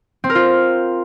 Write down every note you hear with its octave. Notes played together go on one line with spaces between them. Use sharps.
C4
A#4
F4